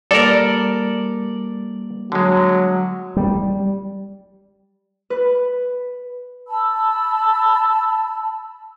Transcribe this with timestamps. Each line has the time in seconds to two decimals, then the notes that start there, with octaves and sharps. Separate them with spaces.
0.11 G3 A#3 A4 A#4 D5
2.12 D3 F#3 G#3
3.17 G3
5.10 B4
6.48 A5 B5 E6